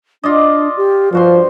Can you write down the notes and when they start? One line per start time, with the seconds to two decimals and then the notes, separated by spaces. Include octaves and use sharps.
0.24 D4 F4 D5 D#5
0.77 G4
1.13 G2 F3 F#4 C5 C6